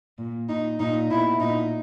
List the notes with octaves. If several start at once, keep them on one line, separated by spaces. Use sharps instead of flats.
A#2
A#2 D#4
A#2 D#4
B2 E4
A#2 D#4